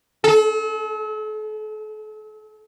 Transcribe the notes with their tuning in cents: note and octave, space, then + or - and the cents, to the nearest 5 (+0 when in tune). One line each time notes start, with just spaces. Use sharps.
A4 -40